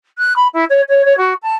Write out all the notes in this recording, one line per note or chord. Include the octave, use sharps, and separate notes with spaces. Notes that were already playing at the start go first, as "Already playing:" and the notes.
F#6
B5
E4
C#5
C#5
C#5
F#4
A5